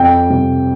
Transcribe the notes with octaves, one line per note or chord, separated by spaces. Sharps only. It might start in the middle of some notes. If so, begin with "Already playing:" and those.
Already playing: F2 G5
C3